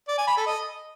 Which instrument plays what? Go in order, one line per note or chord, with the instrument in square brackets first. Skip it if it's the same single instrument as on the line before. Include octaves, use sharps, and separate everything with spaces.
[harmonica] D5
G#5
B5
A4
D#5